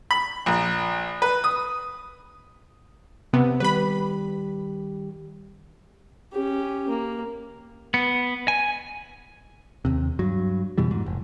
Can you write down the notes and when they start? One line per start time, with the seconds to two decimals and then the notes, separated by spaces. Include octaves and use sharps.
0.11 B5
0.46 A#1
1.22 B4
1.44 D#6
3.33 C3 B3
3.60 D#3 G3 G4 B4 B5
6.33 C#4 G4
6.89 A#3
7.94 B3
8.48 G#5
9.85 D#2 C3
10.19 G2 F#3
10.78 F2 B2 E3 G3
10.91 G#2
11.06 F1